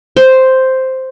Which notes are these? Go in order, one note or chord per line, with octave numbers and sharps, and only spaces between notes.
C5